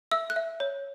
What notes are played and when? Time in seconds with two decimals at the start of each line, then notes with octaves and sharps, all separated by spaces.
0.11 E5 E6
0.30 F#6
0.36 E5
0.60 C#5